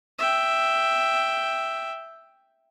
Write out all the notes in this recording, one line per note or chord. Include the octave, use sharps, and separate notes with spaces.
E5 G5